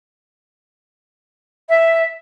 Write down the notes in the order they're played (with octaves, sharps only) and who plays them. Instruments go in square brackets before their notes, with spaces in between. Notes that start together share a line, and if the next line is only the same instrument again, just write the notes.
[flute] E5